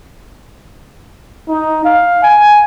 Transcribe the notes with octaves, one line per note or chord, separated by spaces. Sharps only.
D#4
F5
G#5